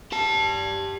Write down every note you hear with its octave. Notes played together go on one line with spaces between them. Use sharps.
G4 A5